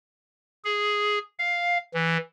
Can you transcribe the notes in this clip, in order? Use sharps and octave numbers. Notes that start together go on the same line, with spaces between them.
G#4
F5
E3